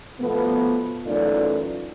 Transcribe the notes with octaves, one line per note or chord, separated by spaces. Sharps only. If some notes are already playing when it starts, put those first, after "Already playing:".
B2 F3 A3 B3
F#2 E3 A3 D#4 F4 D5